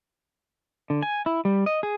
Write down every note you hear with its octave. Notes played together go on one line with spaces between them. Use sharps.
D3
G#5
E4
G3
D#5
G#4